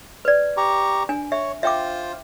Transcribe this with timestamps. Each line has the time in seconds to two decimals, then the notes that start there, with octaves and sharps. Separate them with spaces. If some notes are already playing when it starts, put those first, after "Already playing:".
0.25 B4 D5
0.57 G4 A#5 C#6
1.09 D4 G#5
1.32 C#5 E5
1.63 F4 C5 E5 G5 D6